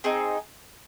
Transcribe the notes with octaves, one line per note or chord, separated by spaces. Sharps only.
C4 D#4 G#4